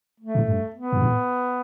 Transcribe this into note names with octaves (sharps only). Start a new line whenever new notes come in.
A3
A2
G2
B3
G2
A2